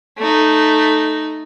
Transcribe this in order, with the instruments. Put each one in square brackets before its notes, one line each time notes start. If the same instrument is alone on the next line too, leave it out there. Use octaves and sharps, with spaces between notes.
[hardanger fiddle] A3 D#4